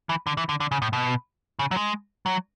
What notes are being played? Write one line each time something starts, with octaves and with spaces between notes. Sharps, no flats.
E3
D3
E3
D3
D3
C#3
A2
B2
C#3
F#3
G#3
F#3